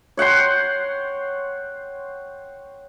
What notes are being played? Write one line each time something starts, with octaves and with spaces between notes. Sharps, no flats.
C#5 F#5 G5 C6